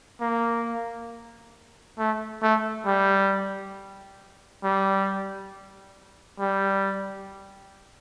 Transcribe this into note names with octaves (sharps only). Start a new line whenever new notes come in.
A#3
A3
A3
G3
G3
G3